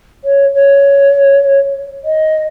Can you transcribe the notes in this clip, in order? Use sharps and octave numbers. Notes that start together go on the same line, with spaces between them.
C#5
C#5
D#5